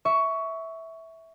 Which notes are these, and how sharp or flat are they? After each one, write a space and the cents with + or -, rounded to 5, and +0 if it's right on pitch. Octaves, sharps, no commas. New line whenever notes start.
E5 -10 C#6 +15